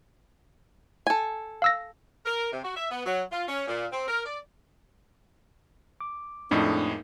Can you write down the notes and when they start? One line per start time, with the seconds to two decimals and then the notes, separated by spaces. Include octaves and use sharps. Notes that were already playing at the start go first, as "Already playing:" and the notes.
1.07 A4 G#5
1.62 F5 E6 A#6
2.25 A#4
2.52 C3
2.64 F#4
2.76 E5
2.91 B3
3.06 F#3
3.31 F4
3.48 C#4
3.67 A#2
3.92 C4
4.08 A#4
4.26 D5
6.01 D6
6.51 F2 A2 G#3 A#3 D4 D#4